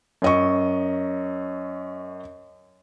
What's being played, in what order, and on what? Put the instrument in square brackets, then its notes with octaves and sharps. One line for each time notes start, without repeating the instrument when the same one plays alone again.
[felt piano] F#2 D#5 C#6